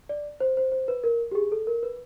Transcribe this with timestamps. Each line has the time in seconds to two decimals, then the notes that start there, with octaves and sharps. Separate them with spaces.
0.09 D5
0.40 C5
0.57 C5
0.72 C5
0.88 B4
1.04 A#4
1.31 G4
1.35 G#4
1.52 A4
1.67 A#4
1.83 B4